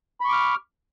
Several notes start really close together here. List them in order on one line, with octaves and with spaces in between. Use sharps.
B5 C#6 D6 F6